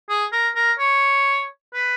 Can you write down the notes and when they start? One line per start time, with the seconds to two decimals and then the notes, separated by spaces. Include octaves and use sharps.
0.09 G#4
0.32 A#4
0.56 A#4
0.79 C#5
1.74 B4